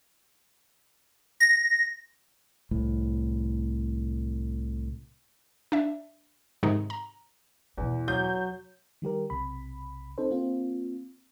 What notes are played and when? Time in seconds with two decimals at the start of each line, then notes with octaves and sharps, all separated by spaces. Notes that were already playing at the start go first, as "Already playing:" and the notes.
1.40 A#6
2.71 C2 A2
5.72 D4 E5
6.63 G#2 C3 D#3 G#3 D#4
6.90 A#5
7.78 E2 B2 E4
8.08 F#3 G6
9.02 D#3 G3 G4 A#4
9.30 B1 C3 B5
10.18 C4 D#4 A4 C5
10.30 A#3 C4 F4